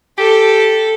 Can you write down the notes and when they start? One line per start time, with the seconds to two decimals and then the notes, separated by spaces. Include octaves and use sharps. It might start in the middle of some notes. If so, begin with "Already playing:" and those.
0.18 G4 A4